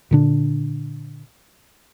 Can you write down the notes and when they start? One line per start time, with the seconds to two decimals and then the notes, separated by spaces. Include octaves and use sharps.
0.11 A#2 D3 D4